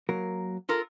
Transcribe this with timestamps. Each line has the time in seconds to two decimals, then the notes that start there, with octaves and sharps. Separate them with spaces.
0.09 F#3 A#3 A#4
0.69 F4 A4 A#4